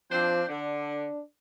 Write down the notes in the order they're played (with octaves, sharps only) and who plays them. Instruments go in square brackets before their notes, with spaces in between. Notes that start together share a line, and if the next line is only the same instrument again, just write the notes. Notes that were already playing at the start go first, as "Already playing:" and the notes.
[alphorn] F3 [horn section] C4 D4 C5
[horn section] D3 [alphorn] D4